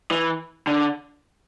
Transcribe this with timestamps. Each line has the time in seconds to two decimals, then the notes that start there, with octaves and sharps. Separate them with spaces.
0.11 E3
0.67 D3